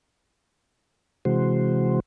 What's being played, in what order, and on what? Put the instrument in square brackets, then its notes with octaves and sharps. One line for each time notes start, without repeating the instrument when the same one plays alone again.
[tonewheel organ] C3 E3 G#3 F#4 C5